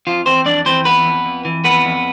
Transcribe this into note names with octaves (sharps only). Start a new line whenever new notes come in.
F2 F3 F4
E3 C4 C5
F2 D4 D5
E3 C4 C5
F2 B3 B4
F2
F2
E3
F2 B3 B4
F2